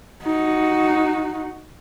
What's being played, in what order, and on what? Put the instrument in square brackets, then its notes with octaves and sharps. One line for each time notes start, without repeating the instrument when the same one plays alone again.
[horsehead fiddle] D#4 F#4